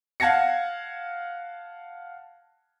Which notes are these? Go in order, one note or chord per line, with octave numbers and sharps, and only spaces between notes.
F5 F#5 A5 G#6 A#6 C#7